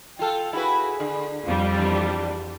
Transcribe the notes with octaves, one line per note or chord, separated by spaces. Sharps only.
F4 A4 G5
E4 F#4 G#4 B4
D3
F2 G3 F4
E2 D4